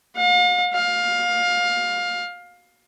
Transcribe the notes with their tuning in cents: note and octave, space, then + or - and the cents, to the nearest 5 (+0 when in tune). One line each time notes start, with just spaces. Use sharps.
F5 +40
F5 +20